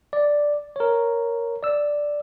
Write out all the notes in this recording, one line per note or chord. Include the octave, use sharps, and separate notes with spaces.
D5
A#4 C#5
D5 E6